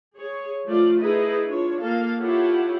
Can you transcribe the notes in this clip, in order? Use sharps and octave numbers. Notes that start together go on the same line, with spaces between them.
G#4 C#5
F3 A3 F4 D5
D#4 E4 G#4 A4 B4 D#5
D4 F4 C#5
A#3 F4 A4 F5
E4 F4 G4 A4 C#5 F#5